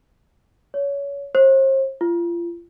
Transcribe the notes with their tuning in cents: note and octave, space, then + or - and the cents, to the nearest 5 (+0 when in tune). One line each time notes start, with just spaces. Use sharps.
C#5 +25
C5 +40
F4 -30